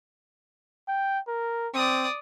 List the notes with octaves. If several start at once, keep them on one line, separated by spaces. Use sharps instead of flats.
G5
A#4
C4 D5 D#6